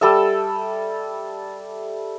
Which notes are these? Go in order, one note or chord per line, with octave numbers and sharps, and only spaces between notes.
G3 A4 E5